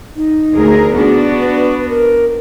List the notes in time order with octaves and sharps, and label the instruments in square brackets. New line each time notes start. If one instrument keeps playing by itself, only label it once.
[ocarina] D#4
[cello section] D2 G#4 A#4
[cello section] B3 D4 F#4 [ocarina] G#4
[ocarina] B4
A#4